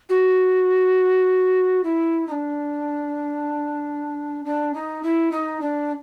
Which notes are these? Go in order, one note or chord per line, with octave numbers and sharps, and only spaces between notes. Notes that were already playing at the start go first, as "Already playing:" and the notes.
F#4
E4
D#4
D4
D4
D#4
E4
D#4
D4